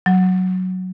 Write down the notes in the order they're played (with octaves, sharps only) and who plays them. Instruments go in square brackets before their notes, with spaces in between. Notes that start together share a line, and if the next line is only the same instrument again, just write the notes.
[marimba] F#3